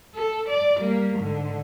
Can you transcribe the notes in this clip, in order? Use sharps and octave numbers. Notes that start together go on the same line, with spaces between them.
A4
D5
G3 A#3
G#2 D3